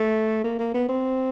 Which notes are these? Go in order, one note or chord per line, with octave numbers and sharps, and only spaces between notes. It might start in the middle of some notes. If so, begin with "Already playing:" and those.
Already playing: A3
A#3
A#3
B3
C4